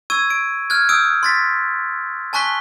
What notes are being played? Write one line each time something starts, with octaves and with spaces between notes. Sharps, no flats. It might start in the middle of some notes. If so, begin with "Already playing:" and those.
C#6 E6 G#6 D#7
D7
F6 F#6 G#6
D#6 E6 G6 D7
C6 A6 B6
G#5 A5 C#6 F#6 B6 G7